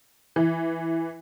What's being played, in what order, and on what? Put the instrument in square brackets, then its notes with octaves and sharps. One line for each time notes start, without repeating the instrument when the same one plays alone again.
[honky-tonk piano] E3